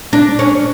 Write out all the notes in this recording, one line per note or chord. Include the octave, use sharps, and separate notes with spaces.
D4
C#4